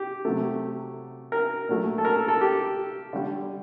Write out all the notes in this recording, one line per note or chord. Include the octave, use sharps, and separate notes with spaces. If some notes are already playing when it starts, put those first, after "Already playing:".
Already playing: G4
C3 F#3 A3
A#4
A#2 F#3 A3
A4
A#4
A4
A4
G4
D3 G3